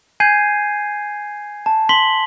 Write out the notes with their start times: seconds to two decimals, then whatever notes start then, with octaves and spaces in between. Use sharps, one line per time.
0.20 G#5 G6 G#6 C7 D#7
1.66 A5
1.89 C6 B6 F#7 G7